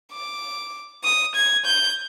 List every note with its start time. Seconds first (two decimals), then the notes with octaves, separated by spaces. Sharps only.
0.13 D6
1.04 D#6
1.35 G#6
1.66 G6